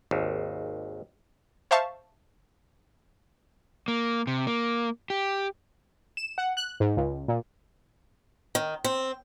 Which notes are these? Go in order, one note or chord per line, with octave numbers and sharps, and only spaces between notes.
G#1 D#2
C5 E5 F5 A5 C#6
A#3
C3
A#3
G4
E7
F#5
F#6
G#2
C#2
A#2
D#3
C4